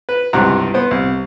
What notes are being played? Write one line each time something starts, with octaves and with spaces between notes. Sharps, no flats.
B4
C#2 G2 C3 E3 F#5 A#5
B3 C5
C2